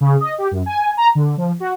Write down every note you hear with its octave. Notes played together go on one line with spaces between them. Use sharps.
C#3
D#5
G4
F#2
G#5
A#5
D3
F3
F#4